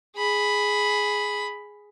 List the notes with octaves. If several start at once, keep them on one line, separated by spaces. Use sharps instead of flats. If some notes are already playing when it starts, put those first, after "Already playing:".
G#4 B5